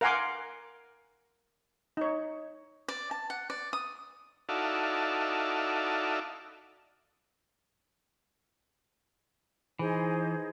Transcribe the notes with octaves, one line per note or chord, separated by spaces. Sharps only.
A#4 F5 F#5 G#5 C6 D6
D#4 C#5
D5
A5
F#5
D5
D#6
D#4 E4 F#4 A4 D5 F5
E3 D#4 G#4 C5